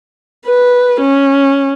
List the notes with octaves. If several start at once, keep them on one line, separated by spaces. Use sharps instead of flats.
B4
C#4